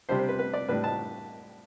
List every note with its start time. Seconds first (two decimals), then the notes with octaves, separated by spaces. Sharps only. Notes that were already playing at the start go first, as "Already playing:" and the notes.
0.09 C3 G3 D4 C5
0.19 C5
0.28 B4
0.39 B4
0.53 D5
0.68 A2 G3 D4 B4
0.84 A5